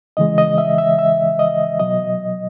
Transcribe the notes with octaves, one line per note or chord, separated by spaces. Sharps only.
C#3 E3 G#3 D#5
D#5
E5
E5
E5
D#5
B2 F#3 D#5